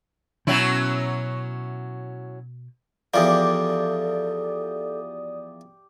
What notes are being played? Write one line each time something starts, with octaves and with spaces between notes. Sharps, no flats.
B2 F#3 C#4 E4
E2 F3 G4 A4 D5 D6 D#6